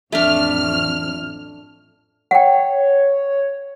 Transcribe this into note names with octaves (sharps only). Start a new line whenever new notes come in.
A1 F2 A3 D4 F6
C#5 F#5 G5